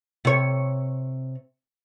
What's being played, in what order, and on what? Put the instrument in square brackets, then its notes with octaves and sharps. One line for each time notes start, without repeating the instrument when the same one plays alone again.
[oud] C3 C#5